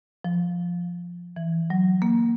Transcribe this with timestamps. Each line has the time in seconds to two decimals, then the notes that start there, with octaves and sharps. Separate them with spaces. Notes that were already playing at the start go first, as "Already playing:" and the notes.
0.24 F3
1.36 E3
1.70 F#3
2.02 A#3